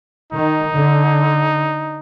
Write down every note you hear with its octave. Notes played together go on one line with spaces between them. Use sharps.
D#3 D#4
D3